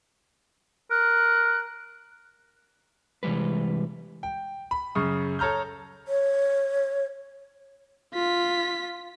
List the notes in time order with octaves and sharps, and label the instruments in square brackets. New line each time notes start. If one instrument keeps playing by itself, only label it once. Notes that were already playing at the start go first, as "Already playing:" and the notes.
[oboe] A#4 [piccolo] F#6
[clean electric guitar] C3 E3 G3 G#3 B4
[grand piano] G5
B5
F#2 C#3 C#6 D#6
A4 C#5 A#5 F6 G6
[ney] C#5
[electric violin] F4 B6